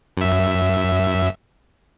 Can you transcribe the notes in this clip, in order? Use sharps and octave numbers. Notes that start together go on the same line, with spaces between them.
F#2 E5